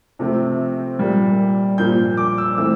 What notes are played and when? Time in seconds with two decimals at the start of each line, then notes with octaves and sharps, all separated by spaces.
0.19 C3 F3 A3 C4
0.99 A#2 G3 A#3
1.78 A#2 F3 A#3 G6
2.17 D6
2.38 E6
2.57 E3 A3 C4 E6